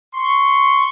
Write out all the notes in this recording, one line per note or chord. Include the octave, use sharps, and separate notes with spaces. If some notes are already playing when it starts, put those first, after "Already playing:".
C6 C#6